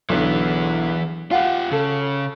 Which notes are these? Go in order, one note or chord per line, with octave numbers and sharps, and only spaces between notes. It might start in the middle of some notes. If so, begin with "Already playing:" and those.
B1 D3 E3 B3
F4 G4 F5 F#5
C#3 A4